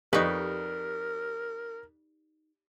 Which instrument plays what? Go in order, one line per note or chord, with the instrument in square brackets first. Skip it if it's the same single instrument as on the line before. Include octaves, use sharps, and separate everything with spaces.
[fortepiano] F2 C#6 [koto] D#4 B4 [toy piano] G4 D5 [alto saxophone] A#4